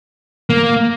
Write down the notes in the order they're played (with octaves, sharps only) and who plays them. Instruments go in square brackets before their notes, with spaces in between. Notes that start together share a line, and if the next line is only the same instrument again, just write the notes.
[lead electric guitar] A#3